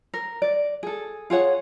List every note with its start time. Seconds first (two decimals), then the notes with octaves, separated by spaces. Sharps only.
0.14 A#4
0.42 D5
0.83 G#4 A4
1.30 F4 G#4 C#5 F#5